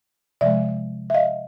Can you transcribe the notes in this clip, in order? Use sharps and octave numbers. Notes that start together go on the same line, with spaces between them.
C3 F3 G#3 D5 E5
E5
D#5 F5